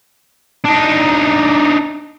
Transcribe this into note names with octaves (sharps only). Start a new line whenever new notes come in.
D4 D#4